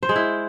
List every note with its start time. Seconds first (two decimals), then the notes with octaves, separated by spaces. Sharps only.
0.03 C5
0.09 G#3
0.16 E4